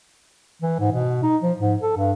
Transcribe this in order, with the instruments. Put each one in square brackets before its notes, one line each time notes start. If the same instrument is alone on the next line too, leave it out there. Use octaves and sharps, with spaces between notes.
[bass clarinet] E3
G#2
B2
D#4
F3
G#2
A4
G2